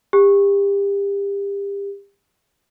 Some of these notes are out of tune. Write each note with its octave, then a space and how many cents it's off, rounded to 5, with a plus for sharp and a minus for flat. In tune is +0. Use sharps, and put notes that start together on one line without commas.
G4 +30